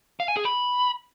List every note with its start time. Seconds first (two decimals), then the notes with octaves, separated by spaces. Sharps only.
0.20 F5
0.28 G#5
0.37 G#4
0.45 B5